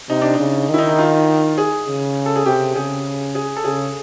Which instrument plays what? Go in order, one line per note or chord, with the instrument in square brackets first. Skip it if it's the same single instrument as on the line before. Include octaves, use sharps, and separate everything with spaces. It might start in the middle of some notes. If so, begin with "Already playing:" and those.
[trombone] C3 [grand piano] D#4
[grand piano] D4
D#4
[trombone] C#3
[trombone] D#3 [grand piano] E4
[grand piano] D#4
D#4
F4
G#4
[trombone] C#3
[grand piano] A4
G#4
[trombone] C3 [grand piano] G4
[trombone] C#3 [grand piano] G#4
[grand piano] G#4
A4
[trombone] C#3 [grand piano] G#4